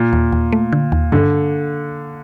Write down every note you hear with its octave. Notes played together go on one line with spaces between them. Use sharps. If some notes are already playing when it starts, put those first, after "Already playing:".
Already playing: A#2
D#2
D#2
A3
D3
D#2
G2 D3